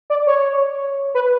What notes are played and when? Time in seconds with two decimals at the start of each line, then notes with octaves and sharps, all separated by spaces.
0.10 D5
0.27 C#5
1.15 B4